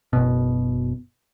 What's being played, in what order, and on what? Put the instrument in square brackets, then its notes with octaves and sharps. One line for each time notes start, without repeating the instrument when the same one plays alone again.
[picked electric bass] F#1 B2